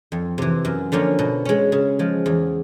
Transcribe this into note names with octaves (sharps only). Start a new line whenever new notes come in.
F2
C3 E3
F#2
D3 F3 A#3 C#4
B2
G#3 C#4
C#3
F3 G#3
E2